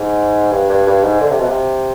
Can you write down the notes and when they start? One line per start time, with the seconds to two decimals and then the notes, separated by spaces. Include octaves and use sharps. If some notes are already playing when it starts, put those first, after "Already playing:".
Already playing: G#2
0.52 G2
0.70 G2
0.87 G2
1.03 G#2
1.21 D3
1.30 C3
1.40 B2
1.49 C3